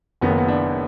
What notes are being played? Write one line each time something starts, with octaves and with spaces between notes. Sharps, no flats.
F#1 F#2 D#3 B3
A#3
B3
D4